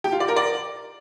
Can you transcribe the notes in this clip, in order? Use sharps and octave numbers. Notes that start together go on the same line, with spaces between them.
G4
F4
D5
A#4
D5